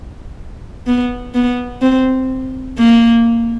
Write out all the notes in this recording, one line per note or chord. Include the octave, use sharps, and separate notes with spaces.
B3
B3
C4
A#3